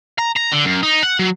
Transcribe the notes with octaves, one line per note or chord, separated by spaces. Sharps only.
A#5
A#5
D3
F#2
D#4
F#5
F#3